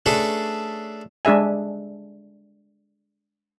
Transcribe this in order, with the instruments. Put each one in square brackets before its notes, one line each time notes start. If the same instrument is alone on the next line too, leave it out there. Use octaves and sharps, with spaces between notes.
[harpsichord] A3 C#4 D4 G#4 A4 B4
[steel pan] G#3 D4 G#4 E5 G#5